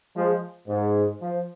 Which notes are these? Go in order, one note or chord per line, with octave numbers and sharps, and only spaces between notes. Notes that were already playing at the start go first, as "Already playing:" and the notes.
F3 G#3
G#2
F3